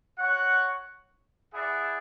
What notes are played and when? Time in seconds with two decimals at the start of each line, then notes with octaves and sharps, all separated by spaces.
0.18 F#4 C#5 F#5
1.52 E4 G#4 D5 F#5